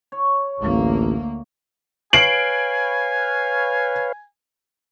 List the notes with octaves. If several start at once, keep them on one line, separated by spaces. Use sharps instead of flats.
C#5
A1 D2 A#3
B4 C#5 F5 G#5 C7 D7 F#7